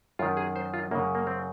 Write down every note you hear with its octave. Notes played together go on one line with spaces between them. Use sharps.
F#2 D#3 F4
G#4
C5
F4
F#2 C#3 A#3
A#3
C4